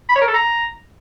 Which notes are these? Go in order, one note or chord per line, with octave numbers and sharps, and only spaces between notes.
B5
C#5
A#4
A4
A#5